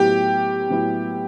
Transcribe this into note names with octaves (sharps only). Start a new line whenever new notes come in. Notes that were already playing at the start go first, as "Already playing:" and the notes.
Already playing: A2 F#3 B3 E4 G4
A2 F#3 B3 E4